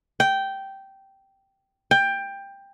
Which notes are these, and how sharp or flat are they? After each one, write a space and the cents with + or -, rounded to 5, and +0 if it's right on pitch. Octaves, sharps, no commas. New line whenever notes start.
G5 -10
G5 +15